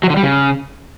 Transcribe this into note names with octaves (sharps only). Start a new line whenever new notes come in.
F#3
D3
G3
C#3